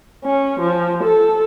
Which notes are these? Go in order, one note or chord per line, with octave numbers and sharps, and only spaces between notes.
C#4
F3
A4